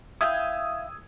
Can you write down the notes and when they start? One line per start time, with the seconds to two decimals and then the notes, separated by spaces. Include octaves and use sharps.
0.21 E4 F5 G5 D#6 E6 G#6